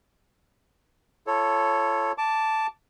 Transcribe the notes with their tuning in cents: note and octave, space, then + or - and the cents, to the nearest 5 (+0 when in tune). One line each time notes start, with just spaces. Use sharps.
F4 -40 A4 +0 C#5 -5
A5 +0 D6 -10